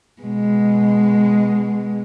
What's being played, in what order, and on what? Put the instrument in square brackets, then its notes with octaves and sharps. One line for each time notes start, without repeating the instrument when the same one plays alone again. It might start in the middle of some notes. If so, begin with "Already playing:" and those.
[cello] B2 G#3